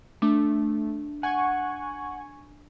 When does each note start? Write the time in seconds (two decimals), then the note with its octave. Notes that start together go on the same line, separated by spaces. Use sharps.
0.22 A3 D4
1.23 F#5 G#5 C#6 G#6